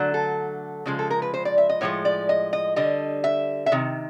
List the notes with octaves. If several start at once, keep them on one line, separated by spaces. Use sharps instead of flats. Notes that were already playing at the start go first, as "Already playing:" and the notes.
Already playing: D3 F#3 A3
A4
C#3 F3 G#3
A4
A#4
B4
C5
D5
E5
D#5
A2 F3 G#3 C#5
D5
D#5
D#5
D3 G3 D#5
E5
E5
C3 D#3